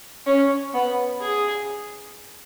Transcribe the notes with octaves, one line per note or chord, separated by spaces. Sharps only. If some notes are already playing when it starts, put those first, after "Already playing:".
C#4
B3
G#4